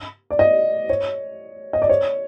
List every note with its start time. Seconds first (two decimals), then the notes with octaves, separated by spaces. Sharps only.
0.30 D5
0.39 D#5
0.89 C#5
1.73 D#5
1.82 D5
1.89 C#5